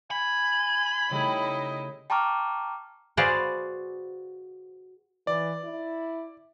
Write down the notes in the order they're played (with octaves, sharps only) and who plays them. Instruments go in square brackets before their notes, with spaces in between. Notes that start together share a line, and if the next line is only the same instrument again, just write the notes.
[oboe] G#5 [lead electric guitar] B5
[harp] C#3 G3 A3 [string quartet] D#4 E4 D#5
[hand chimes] G5 A5 A#5 C#6 D6 F6
[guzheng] F#4 G#4 B4 C5 D5 F5
[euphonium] E3 [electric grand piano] D5
[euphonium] E4